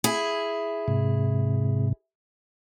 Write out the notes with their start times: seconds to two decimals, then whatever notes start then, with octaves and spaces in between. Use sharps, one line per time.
0.04 E4 G#4
0.88 G#2 C3